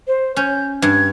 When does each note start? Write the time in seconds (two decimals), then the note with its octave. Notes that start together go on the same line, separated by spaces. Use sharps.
0.08 C5
0.36 C#4 G6
0.82 G2 G#6